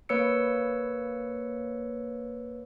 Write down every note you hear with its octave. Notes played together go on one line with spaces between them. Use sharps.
A#3 B4 C#5 E6 C#7